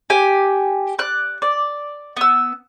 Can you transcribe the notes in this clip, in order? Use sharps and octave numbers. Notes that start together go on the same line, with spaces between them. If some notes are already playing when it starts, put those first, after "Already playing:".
G4 G#5
D5 F#6
D5
B3 E6